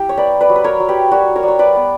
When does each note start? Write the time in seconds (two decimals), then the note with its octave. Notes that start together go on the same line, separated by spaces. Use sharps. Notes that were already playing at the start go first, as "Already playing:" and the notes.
Already playing: E4 G4
0.09 C#5
0.17 A#3 B4 D5
0.41 B4 D5
0.50 F#3
0.56 B4
0.64 A#4 C#5
0.80 F#3
0.88 G4 B4
1.12 G3 F#4 A#4
1.36 A#4 C#5
1.43 G3
1.48 C#5
1.59 B4 D5
1.76 B3